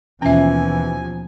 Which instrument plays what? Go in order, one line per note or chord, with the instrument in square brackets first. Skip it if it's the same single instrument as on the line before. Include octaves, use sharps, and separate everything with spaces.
[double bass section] D#2 B2 F3 [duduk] E3 [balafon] C#4 E5 [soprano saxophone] G#5